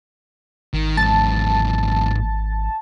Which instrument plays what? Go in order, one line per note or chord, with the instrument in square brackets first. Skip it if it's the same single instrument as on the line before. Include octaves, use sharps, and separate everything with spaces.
[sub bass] G#1 [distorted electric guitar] D#3
[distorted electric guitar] E2 G#2 [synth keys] A5